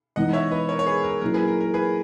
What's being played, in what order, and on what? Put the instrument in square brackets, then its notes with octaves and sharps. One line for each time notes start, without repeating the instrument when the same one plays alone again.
[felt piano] E3 G#3 B3 D#4 [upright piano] D#5 F#5
[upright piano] C#5 E5
B4 D#5
A#4 C#5
C#5
G#4 B4
A#4
[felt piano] A#2 F#3 C#4 E4 [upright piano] A#4
[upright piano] G#4 B4
A#4
A#4
G#4 B4